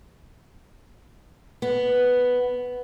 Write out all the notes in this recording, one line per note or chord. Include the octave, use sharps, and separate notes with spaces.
B3